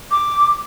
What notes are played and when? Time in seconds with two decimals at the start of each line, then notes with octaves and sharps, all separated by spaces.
0.11 D6